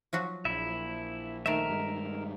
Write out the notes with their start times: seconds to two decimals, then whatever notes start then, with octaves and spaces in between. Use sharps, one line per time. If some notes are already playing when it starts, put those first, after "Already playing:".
0.13 F3 F#3 F#4
0.45 A#1 E4 E5
1.46 D#3 A3 A#4 E5
1.70 G2 G#3